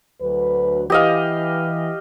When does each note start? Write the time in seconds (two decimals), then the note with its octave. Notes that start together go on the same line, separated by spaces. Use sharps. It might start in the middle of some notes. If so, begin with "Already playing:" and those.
0.21 D2 F#3 B4
0.90 E3 G4 D#5 F5